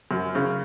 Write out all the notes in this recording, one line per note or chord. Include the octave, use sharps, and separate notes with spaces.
F#2
C#3